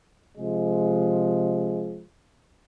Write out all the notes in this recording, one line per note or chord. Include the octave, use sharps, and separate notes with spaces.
C3 F3 G#3